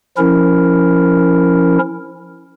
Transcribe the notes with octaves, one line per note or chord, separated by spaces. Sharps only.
F3 C#4 E4 A#4